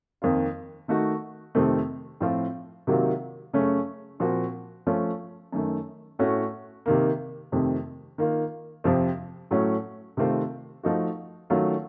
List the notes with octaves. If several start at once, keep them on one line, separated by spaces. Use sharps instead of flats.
F2 D#3 A#3 F4
D#3 A3 D#4 F#4
F2 C3 D#3 A3 C4
A2 F3 C4 F4
C3 D#3 F#3 A#3 F4
F#2 C#3 A3 C#4
A#2 F3 C4 F#4
F3 A3 C#4 F4
F#2 D#3 A3
A2 A3 C#4 F#4
C3 D#3 A#3
F2 C3 D#3 A3
D#3 A#3 F4
F2 C3 F3 C4
A2 F#3 A3 C#4
C3 D#3 A3 C4 F4
F3 A3 D#4 F#4
D#3 F#3 A3 C#4 F4